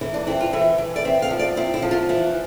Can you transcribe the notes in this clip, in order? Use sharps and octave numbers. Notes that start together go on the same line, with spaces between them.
E3 E4
D4
C4 E4
F4
E3 E5
E3
D5
C4 E5
F5
F3
D5
C4 E4
E4
F3
F4
E3 E4